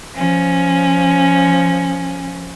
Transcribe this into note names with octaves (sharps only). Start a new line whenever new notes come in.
F3 C#4